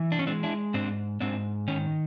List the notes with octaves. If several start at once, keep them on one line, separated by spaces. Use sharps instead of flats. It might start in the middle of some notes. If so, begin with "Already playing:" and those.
Already playing: E3
D4
C#4
G#3 C4 D4
D4 E4
G#2 C4 D4
G#2 C4 D4
D#3 C#4